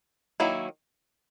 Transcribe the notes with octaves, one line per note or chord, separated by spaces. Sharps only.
D#3 F#3 A#3 E4